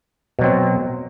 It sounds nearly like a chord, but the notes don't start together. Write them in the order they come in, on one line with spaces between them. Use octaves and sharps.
B2 F#3 C4